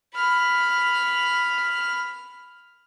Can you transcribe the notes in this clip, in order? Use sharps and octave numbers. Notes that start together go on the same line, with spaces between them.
B5 F6